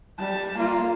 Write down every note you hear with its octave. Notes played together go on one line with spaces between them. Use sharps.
G3 A5
A#3 F4